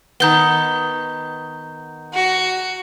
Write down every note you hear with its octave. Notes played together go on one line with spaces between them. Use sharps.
D#3 B3 A#5 G6 G7
F#4